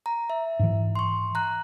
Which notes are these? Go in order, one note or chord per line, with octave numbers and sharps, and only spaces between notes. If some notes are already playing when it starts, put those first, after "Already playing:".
A#5
E5
G#2 E3
C6 C#6
A#5 F#6